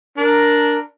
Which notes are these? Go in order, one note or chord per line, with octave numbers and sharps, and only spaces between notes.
D4 A#4